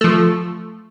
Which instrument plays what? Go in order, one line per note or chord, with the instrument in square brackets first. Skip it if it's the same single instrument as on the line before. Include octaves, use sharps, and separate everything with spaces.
[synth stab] F3 A3